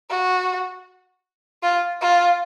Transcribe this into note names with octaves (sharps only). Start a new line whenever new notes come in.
F#4
F4
F4